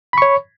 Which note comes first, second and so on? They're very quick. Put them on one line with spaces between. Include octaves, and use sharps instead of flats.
B5 C#6 C#5